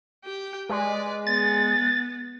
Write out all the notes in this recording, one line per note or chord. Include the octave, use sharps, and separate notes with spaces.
G4 G5
G#3 B4 D5
B3 A6